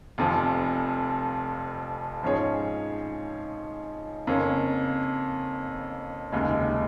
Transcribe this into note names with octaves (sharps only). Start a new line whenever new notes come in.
F1 F2 F3
G#2 F3 C#4 G#4 C#5
F2 C#3 A#3 C#4
F1 D#2 C#3 G#3